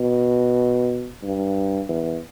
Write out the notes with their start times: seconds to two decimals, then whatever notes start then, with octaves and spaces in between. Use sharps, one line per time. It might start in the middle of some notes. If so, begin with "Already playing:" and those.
Already playing: B2
1.23 G2
1.88 E2